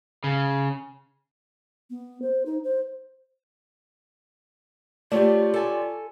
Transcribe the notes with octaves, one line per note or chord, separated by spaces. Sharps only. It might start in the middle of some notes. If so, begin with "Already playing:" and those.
C#3
B3
C5
D#4
C5
A3 F4 G4 C#5 D5
A4 G#5